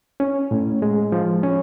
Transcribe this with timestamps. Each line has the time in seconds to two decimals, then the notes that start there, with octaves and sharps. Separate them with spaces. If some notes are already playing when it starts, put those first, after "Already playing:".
0.20 C#4
0.51 A2
0.82 G#3
1.12 F3
1.43 C#4